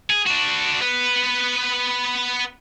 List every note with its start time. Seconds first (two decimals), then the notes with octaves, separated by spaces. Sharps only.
0.10 G#4
0.27 D4 F#4
0.81 B3 B4